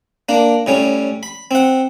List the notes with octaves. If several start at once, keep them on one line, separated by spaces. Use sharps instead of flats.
A#3 D4
A2 G3 C#4
B5
C4 F#5